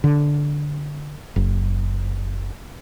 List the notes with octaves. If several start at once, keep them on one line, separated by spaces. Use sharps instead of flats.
D3
F#1